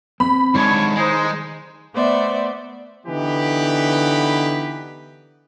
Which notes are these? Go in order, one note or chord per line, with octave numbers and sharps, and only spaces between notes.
C4 B5
G#2 D#3 D4 C#5
G#3 D#4 C5
A3 B3 C5 D5 E5
D3 E3 B3 D#4 G4 B4